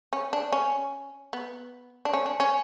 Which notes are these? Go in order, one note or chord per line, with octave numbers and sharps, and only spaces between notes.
C#4
D4
C#4
B3
D4
C#4
D4
C#4